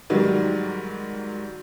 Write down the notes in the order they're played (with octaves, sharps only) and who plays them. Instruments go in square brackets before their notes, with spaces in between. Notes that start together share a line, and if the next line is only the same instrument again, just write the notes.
[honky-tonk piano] G#2 D#3 F#3 G3